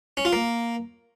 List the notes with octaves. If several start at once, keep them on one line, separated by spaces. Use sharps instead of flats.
C#4
F4
A#3